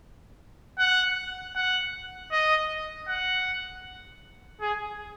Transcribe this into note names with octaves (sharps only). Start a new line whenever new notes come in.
F#5
F#5
D#5
F#5
G#4